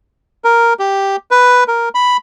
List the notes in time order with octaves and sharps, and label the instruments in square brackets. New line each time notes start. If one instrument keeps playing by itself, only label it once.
[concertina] A#4
G4
B4
A#4
B5